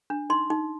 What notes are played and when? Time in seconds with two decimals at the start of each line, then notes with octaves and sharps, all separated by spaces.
0.10 D4
0.30 D#4 C6
0.50 D#4